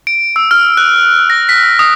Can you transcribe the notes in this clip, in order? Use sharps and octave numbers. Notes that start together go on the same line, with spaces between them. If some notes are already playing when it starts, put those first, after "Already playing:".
D7
E6
F6
F#6
A#6
B6
D#6